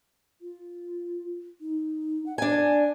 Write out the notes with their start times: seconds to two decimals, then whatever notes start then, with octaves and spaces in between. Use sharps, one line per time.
0.41 F4
1.61 D#4
2.26 F#5
2.38 D4 D5 G#5